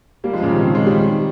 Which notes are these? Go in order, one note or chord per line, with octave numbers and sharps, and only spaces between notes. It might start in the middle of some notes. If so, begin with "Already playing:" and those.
G3 A#3
F3 G#3
A#2 C#3
C3 D#3
C#3 F3
F3 G#3
D#3 G3